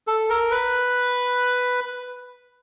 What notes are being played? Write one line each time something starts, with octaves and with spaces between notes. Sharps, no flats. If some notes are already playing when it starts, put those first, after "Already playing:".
A4
A#4
B4